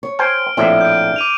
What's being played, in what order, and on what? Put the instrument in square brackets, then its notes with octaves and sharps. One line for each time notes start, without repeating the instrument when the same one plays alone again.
[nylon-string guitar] C#5
[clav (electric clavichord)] C5 G5 G#5 [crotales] F6 D7
[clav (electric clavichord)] A#1 A2 C4 [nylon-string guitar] D4 E4 E5
[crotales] G6 D7
D6 D#7 F7